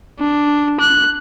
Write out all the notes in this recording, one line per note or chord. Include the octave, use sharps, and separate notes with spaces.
D4
F#6